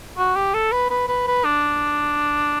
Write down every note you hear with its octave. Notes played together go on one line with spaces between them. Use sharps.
F#4
G4
A4
B4
B4
B4
B4
D4